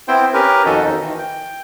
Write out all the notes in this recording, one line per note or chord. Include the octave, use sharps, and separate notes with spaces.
B3 C4 E4 C5 G5
C#4 G4 A#4 B4
F2 B2 D#3 F#4 A4 D#5
D#2 D#4
D#3 E3
G5